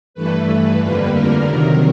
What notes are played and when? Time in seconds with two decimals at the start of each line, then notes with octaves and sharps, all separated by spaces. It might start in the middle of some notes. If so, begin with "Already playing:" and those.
0.14 G2 E3 A3 B4
0.48 B4
0.80 F2 D3 G3 A#3 B4
1.13 A#4
1.46 C3 D#3 F#3 A#4